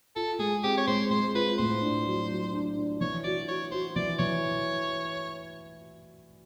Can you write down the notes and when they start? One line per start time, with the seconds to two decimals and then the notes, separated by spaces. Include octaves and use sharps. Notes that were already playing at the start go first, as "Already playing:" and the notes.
0.16 F4 A4
0.39 G#3 G#4
0.64 C4 G4
0.77 C#5
0.87 G#3 C5
1.10 G#3 C5
1.34 F4 B4
1.58 A2 C5
1.82 D4
2.06 F#3
2.30 F#3
2.53 D4
2.77 D4
3.01 E3 C#5
3.24 F#4 D5
3.48 F#4 C#5
3.71 F#4 C5
3.96 E3 D5
4.19 E3 C#5